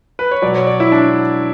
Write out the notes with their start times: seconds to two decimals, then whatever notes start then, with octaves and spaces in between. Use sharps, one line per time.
0.19 B4
0.31 C#5
0.42 B2 F#3 D5
0.55 C#5
0.67 D5
0.80 E4
0.92 D4